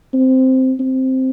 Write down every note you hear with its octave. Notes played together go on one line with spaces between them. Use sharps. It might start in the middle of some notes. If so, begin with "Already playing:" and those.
C4
C4